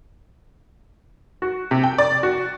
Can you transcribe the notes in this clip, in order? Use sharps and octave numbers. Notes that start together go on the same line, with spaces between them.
F#4
C3
G5
D5
F#4